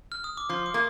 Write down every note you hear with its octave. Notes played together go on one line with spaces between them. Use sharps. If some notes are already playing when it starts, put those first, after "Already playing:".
F6
D#6
D6
F3 C6
D6
A#3